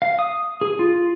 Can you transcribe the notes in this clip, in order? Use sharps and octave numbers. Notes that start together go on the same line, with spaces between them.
F5
D#6
G#4
F4